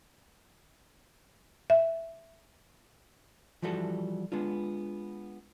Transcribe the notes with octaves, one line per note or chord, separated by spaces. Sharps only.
E5
E3 F3 G3 F#4 A4
G#3 B3 D4 F4